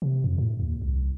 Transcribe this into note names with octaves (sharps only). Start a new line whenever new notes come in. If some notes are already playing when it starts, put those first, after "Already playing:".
C3
F2
A2
D#2
C2